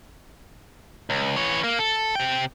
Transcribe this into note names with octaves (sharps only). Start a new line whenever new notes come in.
C#2
E3 C#5
A#3
A4
C3 G5